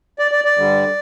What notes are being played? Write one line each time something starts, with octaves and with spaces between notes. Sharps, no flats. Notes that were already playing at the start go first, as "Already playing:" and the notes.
D5
D5
D5
G2 D3 G3